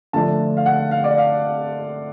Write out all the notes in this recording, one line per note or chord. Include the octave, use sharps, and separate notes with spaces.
D3 F3 A3 D4 A5
F5
F#5
F5
D5
F5